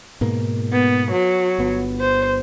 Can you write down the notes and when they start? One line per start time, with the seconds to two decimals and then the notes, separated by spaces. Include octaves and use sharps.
0.21 G#2 B2 A#3
0.73 B3
1.12 F#3
1.58 G1 B3
2.01 C5